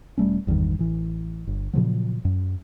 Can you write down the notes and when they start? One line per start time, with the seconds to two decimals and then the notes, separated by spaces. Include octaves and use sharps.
0.18 E1 G3 A3 C#4
0.47 G#1 E2 G2 D#3
0.79 A1 E3
1.47 G1
1.73 A#2 C#3 F3 F#3
2.25 F#2